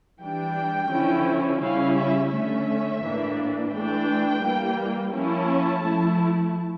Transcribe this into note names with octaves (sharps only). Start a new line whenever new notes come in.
E3 G3 D4 G5
D3 F3 C#4 E4
C#3 G3 C#4 E4 F5
E5
D3 A3 C#4 E5
A2 E3 A#3 D4
E3 A3 D4 G5
E3 G3 A#3
F3 A#3 C#4 E4 A5
F3 A3 E4